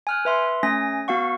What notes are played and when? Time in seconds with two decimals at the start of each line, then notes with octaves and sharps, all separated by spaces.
0.07 G#5 F6 F#6
0.25 B4 E5 C6
0.63 A3 C#4 G#5 A#6
1.08 B3 F#4 F5 F#5 C#6